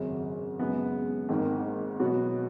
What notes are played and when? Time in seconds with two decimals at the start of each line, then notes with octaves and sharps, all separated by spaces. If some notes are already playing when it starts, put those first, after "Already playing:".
Already playing: G#1 F#2 C#3
0.59 F#2 C#3 G#3 B3
1.29 G#1 G#2 D#3 A#3
1.99 B2 F#3 B3 F#4